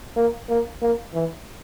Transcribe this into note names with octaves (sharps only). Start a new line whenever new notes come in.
A#3
A#3
A#3
E3